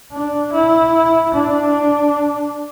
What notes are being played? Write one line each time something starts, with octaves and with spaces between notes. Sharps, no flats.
D4
E4
D4